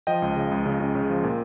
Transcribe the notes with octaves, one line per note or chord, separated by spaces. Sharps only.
F3 D#5 G5
C#2
C#3
C#2
C#3
C#3
C#3
F3
A#2